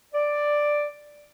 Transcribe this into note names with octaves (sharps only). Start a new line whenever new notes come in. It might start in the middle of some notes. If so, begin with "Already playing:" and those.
D5